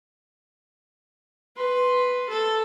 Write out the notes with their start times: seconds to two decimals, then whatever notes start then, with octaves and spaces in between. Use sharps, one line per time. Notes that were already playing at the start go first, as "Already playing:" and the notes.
1.56 B4 C6
2.29 A4